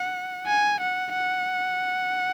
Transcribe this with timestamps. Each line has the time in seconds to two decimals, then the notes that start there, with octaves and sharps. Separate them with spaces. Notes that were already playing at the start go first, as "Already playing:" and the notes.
Already playing: F#5
0.47 G#5
0.80 F#5
1.13 F#5